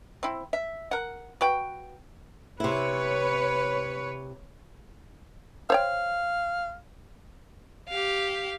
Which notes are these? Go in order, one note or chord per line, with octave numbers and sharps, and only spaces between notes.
C4 E4
E5
A#4 F#5
F#4 B4 G5
C3 E4 B4 C#5
C5 C#5 F5 G5
G4 F5